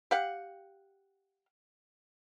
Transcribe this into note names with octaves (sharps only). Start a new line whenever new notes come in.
G4 F5 F#5